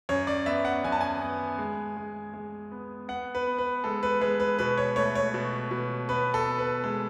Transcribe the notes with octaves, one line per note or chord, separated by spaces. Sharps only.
F#2 C#5
D5
B3 E5
F#5
F#2 G#5
A5
G#5
B3
G#3
G#3
G#3
B3
B3 F#5
B4
B3
B4
G#3 A4
B4
G#3 B4
B4
B2 B4
C#5
A3 C#5
C#5
B2
B2
B3 B4
A4
B3
B4
G#3 A4